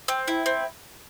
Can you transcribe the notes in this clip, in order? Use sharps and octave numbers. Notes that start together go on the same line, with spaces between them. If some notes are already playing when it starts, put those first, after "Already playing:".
C4
E4
C4